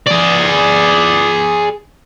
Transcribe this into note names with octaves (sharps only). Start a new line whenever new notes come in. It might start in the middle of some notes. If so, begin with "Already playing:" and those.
G#4 D5